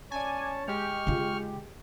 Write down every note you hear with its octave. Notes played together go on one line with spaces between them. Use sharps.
C#4 C#5 D5 G#5 A5
G#3 G4 G5 C#6 F6
C#3 F4